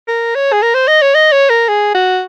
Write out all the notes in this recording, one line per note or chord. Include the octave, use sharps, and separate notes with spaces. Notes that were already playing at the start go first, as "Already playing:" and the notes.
A#4
C#5
G#4
A#4
C5
D#5
C#5
D#5
C#5
A#4
G#4
F#4